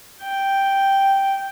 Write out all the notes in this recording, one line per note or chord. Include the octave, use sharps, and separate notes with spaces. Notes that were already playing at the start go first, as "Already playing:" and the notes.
G5